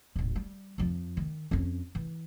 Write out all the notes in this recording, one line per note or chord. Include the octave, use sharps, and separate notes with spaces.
D#1 A1
G3
F2 F3
D#3
F2 C#4
E3